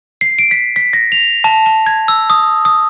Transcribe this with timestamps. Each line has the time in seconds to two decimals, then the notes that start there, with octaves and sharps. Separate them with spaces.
0.21 C7
0.39 D7
0.51 B6
0.76 B6
0.93 A#6
1.12 F7
1.44 A5
1.66 A5
1.86 G#6
2.08 E6
2.30 D#6
2.65 D#6